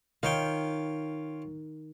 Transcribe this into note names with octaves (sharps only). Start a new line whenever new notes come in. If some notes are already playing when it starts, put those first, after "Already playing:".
D#3 F4 C#5 G5